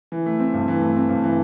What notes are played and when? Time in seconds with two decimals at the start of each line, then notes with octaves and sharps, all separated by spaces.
0.12 E3
0.26 A3
0.39 C4
0.54 G2
0.68 E3
0.81 A3
0.96 C4
1.09 G2
1.24 E3